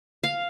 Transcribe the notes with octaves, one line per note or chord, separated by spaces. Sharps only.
F5